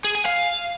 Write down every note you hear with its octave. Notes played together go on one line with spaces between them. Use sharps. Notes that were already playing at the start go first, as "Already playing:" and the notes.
G#4
G#5
F5